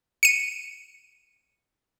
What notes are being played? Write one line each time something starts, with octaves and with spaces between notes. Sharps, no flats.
C#7 D#7